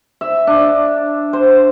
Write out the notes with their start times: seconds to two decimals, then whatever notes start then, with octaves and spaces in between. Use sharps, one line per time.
0.21 E5
0.47 D4
1.33 C5